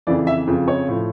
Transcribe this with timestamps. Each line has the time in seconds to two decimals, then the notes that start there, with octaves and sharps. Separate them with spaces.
0.07 F2 C#3 E3 D5
0.27 E5
0.47 F2 C#3 F3
0.68 C#5
0.88 A2 F3